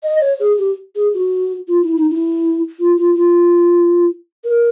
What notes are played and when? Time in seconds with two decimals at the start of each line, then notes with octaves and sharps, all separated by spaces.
0.03 D#5
0.21 C#5
0.40 G#4
0.58 G4
0.95 G#4
1.14 F#4
1.68 F4
1.83 E4
1.97 D#4
2.10 E4
2.79 F4
2.98 F4
3.15 F4
4.44 A#4